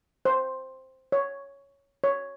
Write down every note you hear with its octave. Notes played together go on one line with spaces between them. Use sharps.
C5
C#5
C#5